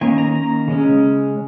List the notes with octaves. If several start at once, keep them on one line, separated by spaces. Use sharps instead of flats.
D#3 A#3 C#4 G#5
A#5
A#5
C#3 G#3 C#4